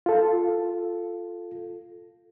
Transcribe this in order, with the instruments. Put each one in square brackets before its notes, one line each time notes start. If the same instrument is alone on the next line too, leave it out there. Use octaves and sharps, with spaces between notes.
[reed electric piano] F4 A4